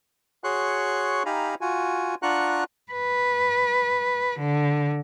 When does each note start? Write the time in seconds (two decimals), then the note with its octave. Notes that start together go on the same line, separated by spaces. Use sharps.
0.44 F#4 G#4 C#5 C6 C#6 F#6
1.26 D#4 G4 F5 G#5 A#5 B5
1.61 F4 F#4 G#5
2.23 D4 F4 F#5 A#5 C#6 F#6
2.92 B4
4.39 D3